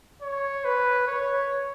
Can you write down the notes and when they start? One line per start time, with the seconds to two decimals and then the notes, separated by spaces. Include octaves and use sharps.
0.22 C#5
0.65 B4
1.07 C#5